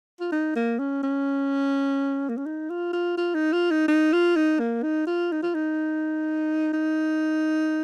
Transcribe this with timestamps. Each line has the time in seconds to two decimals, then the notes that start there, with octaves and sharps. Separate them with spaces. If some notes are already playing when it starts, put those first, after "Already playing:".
0.20 F4
0.32 D#4
0.56 A#3
0.79 C#4
1.03 C#4
2.29 A#3
2.37 C#4
2.46 D#4
2.70 F4
2.93 F4
3.18 F4
3.35 D#4
3.53 F4
3.71 D#4
3.88 D#4
4.13 F4
4.36 D#4
4.59 A#3
4.83 D#4
5.07 F4
5.32 D#4
5.43 F4
5.54 D#4
6.73 D#4